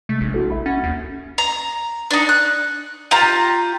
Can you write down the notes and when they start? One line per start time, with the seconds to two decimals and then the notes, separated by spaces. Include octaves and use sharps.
0.09 C3 G#3 A3
0.21 A#1
0.34 E4 F#4 A4
0.50 E5 B5
0.66 C#4 F#5 A6
0.84 D#2
1.38 A#5
2.11 D4 D#4
2.29 F#6
3.11 F4 G4 A#5